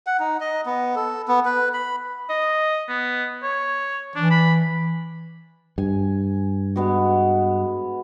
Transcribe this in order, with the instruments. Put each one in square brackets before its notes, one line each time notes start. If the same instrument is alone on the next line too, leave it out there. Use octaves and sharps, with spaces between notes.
[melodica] F#5
D#4
D#5
B3
A4
B3
B4
B5
[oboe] D#5
B3
C#5
[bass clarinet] E3 [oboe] D4
[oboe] B5
[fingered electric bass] G2 [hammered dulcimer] G#5
[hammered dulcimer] G#3 B3 F#4